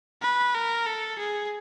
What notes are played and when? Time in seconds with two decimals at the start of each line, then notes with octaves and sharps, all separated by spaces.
0.22 B4
0.54 A#4
0.86 A4
1.19 G#4